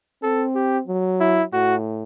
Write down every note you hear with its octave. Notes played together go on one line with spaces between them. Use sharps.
C4 A4
G4
F#3
E4
A2 F#4